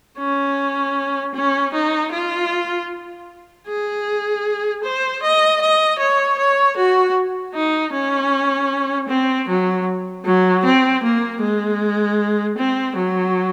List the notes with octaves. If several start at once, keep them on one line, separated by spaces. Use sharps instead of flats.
C#4
C#4
D#4
F4
G#4
C5
D#5
D#5
C#5
C#5
F#4
D#4
C#4
C4
F#3
F#3
C4
A#3
G#3
C4
F#3